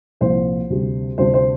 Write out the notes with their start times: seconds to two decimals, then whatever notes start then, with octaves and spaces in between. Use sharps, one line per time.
0.21 C2 A#2 F3 C4 E4 C5
0.70 D2 C3 G3
1.18 D2 C3 G3 D4 C5
1.34 C5